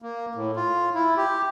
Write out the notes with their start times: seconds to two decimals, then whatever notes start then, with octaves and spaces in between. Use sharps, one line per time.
0.02 A#3
0.35 A2
0.56 F4
0.94 E4
1.17 G4